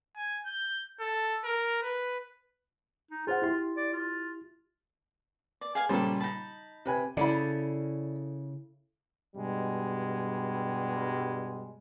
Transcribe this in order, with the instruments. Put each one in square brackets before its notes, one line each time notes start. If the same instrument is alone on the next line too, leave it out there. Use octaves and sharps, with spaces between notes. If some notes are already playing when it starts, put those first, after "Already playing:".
[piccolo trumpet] G#5
G6
A4
A#4
B4
[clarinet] D#4
[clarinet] F4 [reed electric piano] G#4 C5 F#5
[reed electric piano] E4 G4 C6
[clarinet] D5
F4
[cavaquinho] D5
G#4 F5 G#5
[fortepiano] A#2 C#3 G3 [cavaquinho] A4 C5
[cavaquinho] D#4 A5 [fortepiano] B5
[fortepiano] C3 B4 G#5
[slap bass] C#3 [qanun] E4 A4 [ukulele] D5 B5
[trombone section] G2 B2 G3 G#3